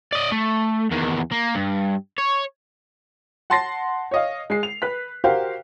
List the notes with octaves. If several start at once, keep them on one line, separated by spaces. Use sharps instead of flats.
D5 D#5
A3
E2 D#3
A#3
G2
C#5
F#5 A5 C6 A6 A#6 C7
C#5 D#5 F5
G#3 C7
F7
B4 F#6 B6
F#4 G4 A#4 C5 F5 G5